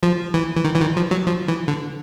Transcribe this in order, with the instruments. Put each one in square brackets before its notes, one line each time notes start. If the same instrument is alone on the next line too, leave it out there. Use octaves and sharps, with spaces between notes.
[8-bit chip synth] F3
E3
E3
D#3
E3
D#3
F3
F#3
F3
E3
D3